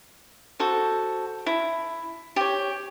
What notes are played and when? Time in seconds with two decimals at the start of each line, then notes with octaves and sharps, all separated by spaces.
0.59 F#4 A4 C5
1.46 E4
2.36 G4 C#5